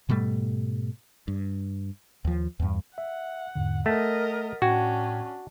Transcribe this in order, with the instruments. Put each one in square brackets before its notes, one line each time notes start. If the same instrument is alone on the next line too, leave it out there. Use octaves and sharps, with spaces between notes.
[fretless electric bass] G#2 B2 G3 A3
G2
D#2 F3
E2 G2
[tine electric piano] E5 [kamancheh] F#5
[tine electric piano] E2 G#2 D3
[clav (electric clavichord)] A3 [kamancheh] A#4 D#5 [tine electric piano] F#5 A6 B6
[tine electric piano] A2 G5 G#6 [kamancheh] C#4 D4 [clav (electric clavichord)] F#4